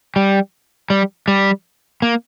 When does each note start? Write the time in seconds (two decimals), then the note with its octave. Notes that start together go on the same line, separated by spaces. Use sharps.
0.16 G3
0.90 G3
1.28 G3
2.02 A#3